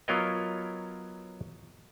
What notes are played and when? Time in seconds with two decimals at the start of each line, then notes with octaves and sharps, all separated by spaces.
0.08 F#3 B3 F4 A#4 C#5 D#5